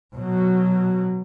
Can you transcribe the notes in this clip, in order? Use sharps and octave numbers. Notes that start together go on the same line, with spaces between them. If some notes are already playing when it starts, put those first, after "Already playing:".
B2 F#3